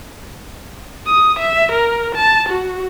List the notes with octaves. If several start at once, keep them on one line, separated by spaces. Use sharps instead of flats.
D#6
E5
A#4
A5
F#4